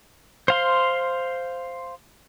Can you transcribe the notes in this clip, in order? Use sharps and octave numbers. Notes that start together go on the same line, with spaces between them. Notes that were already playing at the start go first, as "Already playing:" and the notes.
C5 F5 C6